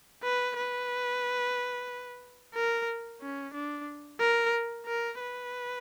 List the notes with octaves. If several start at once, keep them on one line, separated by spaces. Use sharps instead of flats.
B4
B4
A#4
C#4
D4
A#4
A#4
B4